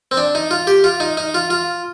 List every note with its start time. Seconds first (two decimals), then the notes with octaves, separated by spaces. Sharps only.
0.11 C4
0.17 D4
0.35 D#4
0.51 F4
0.67 G4
0.84 F4
1.00 D#4
1.17 D#4
1.34 F4
1.50 F4